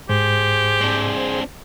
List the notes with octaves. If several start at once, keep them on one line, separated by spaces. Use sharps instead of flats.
G#2 G4 G#4 C5
C4 D4